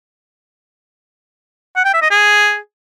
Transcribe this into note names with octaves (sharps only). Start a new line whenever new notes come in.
F#5
G5
E5
D#5
G#4